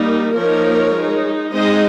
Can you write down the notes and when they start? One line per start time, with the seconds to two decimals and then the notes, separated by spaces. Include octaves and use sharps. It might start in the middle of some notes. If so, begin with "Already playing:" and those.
Already playing: G3 A#3 D#4
0.34 F3 A#3 D#4 A#4 C#5
0.94 G#3 D#4
1.53 G#3 C4 D#4 C5 D#5